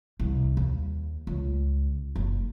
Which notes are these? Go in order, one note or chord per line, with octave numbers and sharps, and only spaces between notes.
C2
D#2
C#2
F#1